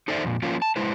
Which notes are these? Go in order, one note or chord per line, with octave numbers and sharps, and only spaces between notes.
D#4 A4 C5 D5 E5
F2 A#2
F3 A#3 C#4 F4
A5
G#3 E4 B4 C5